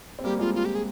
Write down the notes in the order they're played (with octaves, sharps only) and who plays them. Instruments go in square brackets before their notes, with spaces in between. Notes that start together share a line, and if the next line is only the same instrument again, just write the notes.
[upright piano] C4
[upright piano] G3 A#3 [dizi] G4
[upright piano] G#3 C4 [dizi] F4
[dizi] F4
G4
G#4